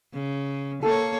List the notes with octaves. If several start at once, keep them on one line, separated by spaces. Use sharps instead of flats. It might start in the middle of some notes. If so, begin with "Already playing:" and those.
C#3
A#3 A4 C#5